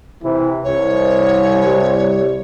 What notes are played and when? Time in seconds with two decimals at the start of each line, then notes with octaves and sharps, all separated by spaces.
0.22 C3 E3
0.64 C2 C#5
1.66 G3